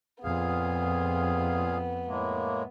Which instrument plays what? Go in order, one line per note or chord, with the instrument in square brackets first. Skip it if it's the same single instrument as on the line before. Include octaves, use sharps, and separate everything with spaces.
[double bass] F2 [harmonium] A#2 G#4 F5 [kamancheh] B3
[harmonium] A2 G#3 A#3